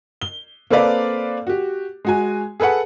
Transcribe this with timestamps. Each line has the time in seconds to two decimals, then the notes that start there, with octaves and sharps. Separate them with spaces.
0.22 G7
0.70 A#3 C4 A4 B4 D5 F5
1.47 F#4 G4
2.05 G#3 F#4 G#5
2.60 G#4 A4 B4 F#5